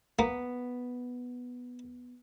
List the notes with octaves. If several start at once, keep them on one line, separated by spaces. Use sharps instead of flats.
A#3 B3